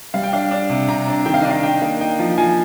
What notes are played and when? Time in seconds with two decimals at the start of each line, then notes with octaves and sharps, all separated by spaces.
0.14 G3 F5
0.23 G5
0.33 D4 F5
0.51 D4
0.69 C3
0.88 C3 A#5
1.07 D4
1.26 D#3 G5
1.34 F5
1.42 D4 D#5
1.51 F5
1.63 D#4 G5
1.82 A#3
2.01 D#4 G5
2.19 F3
2.37 F3 G#5